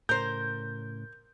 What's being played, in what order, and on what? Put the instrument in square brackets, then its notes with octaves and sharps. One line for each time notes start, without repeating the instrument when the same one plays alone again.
[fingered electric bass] A2 C#3 [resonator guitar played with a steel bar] A#4 C5 [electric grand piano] G6